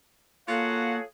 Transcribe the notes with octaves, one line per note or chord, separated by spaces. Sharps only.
A#3 F4 F#4 G#4 A4 C#5 F5 F#5